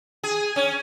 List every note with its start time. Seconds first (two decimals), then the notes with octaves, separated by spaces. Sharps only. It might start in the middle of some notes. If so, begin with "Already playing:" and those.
0.24 G#4
0.56 C#4